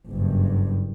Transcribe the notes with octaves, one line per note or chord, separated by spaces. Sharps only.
F#1 G2